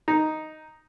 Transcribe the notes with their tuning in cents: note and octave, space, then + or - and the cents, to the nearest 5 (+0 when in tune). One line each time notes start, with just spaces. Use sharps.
D#4 +0